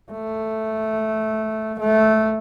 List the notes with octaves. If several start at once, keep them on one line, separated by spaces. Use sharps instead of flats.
A3
A3